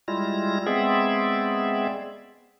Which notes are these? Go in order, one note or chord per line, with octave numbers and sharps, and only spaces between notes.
G3 G#3 E4 F4 A#6
G#3 B3 C4 G#4 D5 E5